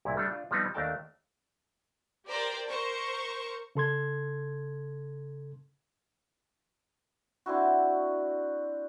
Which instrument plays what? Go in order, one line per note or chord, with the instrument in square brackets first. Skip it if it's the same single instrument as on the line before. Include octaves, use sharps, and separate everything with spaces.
[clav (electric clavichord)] C2 A#2 E4
G3 A3 D4 A4
D4 F4
F3 G3 B3 C4 D#4
D#2 A3 D4 A#4 G5 A5
[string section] G4 A#4 C5 D5 G5
A#4 C5 C#6
[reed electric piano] C#3 A4 C6 G#6
[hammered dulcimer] C4 D4 E4 F#4